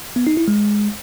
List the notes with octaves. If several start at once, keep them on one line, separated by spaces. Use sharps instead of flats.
B3
D#4
E4
G#3